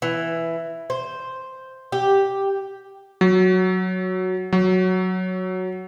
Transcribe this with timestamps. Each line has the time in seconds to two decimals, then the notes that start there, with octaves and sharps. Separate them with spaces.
0.02 E3
0.90 C5
1.92 G4
3.21 F#3
4.53 F#3